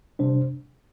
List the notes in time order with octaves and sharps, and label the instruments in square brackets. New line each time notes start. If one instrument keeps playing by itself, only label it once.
[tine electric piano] C3 G3 D4 C5